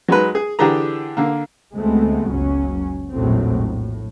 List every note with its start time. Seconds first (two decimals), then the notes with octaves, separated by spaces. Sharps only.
0.08 F#3 G#3 D#4 B4
0.35 G#4
0.59 D3 E3 D4 G4 G#4 A#5
1.17 D3 A#3
1.73 D2 G#3 A3 B3 C4
2.28 F#1 C#2 F#3 C#4
3.12 A#1 E2 A2 F#3 A3 C4
3.67 A2